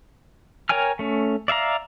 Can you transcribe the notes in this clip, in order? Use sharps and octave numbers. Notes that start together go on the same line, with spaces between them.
A#4 C#5 G5 G#5 F6
A3 C#4
D5 E5 F5 A#5